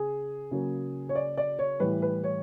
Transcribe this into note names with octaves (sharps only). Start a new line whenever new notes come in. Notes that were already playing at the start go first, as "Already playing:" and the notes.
Already playing: C#3 G#4
C#3 F#3 A#3
C#5
D5
D5
C#5
A2 E3 G3 B4
B4
C#5